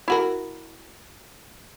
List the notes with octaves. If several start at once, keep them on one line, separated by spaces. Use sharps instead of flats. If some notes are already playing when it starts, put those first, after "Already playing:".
E4 F#4 A#4